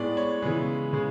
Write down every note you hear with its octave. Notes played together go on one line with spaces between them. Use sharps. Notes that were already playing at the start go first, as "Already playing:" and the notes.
Already playing: A2 G#3 B3 D5
C#5
C#3 E3 G#3 B3
C#3 G#3